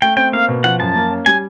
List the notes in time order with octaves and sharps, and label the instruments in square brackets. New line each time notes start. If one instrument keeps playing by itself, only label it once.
[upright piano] A3 [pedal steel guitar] G5
[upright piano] C4 [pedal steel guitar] G5
[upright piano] A#3 [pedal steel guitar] F5
[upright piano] B2
[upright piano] F3 [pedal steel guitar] F#5
[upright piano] F#2 [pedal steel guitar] A5
[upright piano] A#3
C#4
[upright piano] G3 [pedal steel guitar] G#5